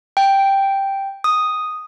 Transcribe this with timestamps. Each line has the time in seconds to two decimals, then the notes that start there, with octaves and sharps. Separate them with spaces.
0.17 G5
1.24 D#6